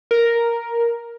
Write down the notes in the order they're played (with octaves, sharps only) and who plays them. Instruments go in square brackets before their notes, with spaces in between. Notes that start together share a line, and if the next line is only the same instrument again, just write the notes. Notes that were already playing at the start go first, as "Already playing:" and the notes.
[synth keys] A#4